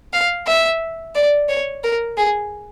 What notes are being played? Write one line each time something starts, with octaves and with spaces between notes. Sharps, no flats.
F5
E5
D5
C#5
A#4
G#4